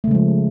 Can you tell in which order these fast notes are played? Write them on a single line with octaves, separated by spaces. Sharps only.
A3 C#3 G#3 F3